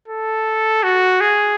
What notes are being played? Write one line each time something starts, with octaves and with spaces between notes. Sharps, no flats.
A4
F#4
G#4